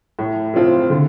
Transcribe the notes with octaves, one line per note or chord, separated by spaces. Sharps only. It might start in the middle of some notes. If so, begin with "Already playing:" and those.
A2
F3 C4 F4
D3